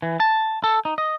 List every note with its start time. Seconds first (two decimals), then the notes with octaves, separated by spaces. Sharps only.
0.02 E3
0.20 A5
0.64 A4
0.85 D#4
0.98 D#5